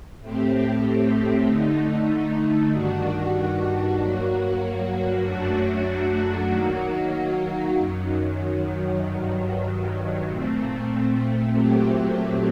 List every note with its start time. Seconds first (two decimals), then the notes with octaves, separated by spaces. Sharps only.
0.20 A2 A3 C4 G4
1.45 D3 A3 D#4
2.71 G2 D#3 G3 D4 F#4
3.97 G2 F#3 A#3 F#4
5.23 F#2 F#3 A3 D4 F#4
6.49 D#3 F#3 A#3 F#4
7.75 F#2 D#3 F#3
9.01 G2 D#3 F#3
10.27 A#2 A3 C4
11.53 A#2 F#3 A3 C4 G4